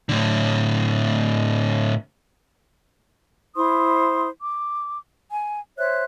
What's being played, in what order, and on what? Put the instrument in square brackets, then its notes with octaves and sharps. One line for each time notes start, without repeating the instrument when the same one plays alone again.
[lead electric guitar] A2 D3
[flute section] E4 C5 C6 D#6
D6
G#5
C5 C#5 E5 F#6